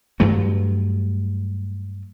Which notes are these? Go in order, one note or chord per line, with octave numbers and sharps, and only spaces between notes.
G2 F#3 A3